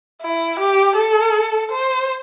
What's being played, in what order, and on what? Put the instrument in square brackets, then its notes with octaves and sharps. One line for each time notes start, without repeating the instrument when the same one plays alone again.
[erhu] E4
G4
A4
C5